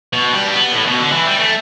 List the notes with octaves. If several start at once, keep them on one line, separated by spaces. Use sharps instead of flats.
B2
G3
D4
B3
A2
B2
D3
E3
G3
A3